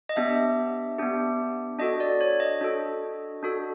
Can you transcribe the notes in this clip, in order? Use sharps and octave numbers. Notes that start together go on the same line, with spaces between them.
D#5
B3 D4 G4 E5
B3 D4 G4
D4 F#4 A4 D#5
D5
C#5
D#5
D4 F#4 A4
D4 F#4 A4